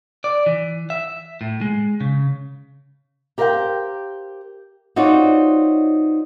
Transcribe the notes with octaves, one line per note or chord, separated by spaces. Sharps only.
D5
E3
E5
A2
G#3
C#3
G4 A#4 C5 D#5 F5 G5
C4 D#4 F4 F#4 C#5 D5